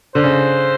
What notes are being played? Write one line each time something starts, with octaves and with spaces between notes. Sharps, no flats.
D3 C5
C#3